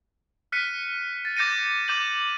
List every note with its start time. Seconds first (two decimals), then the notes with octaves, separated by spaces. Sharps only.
0.52 F6 F#6 B6 C#7 D#7
1.25 A6
1.37 D6 G6 A6 A#6 C#7 D#7
1.88 D6 G6 D#7 F#7